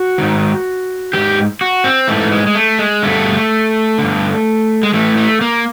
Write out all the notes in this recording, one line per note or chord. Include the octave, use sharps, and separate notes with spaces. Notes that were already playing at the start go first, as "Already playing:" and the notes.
Already playing: F#4
G#2 D#3
G#2 E3 G4
F#4
C4
G#2 E3 A3
G#3
G#3
A3
G#3
G2 D3 A3
G2 D3
G#3
A2 E3 A3
A3
A#3